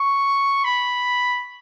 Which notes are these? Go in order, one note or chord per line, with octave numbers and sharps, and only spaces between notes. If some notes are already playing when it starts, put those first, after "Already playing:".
Already playing: C#6
B5